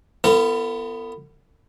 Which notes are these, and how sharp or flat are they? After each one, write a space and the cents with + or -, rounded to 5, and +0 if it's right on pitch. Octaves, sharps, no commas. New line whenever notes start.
B3 +10 F4 -35 A4 +45